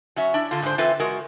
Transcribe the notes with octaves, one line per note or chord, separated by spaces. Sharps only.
F#3 C#4 E5
D4 E4
D3 F4
G#2 D3 A3 D4 C5
E3 C4 F4 A4 B4 E5
G#3 F#4 A#4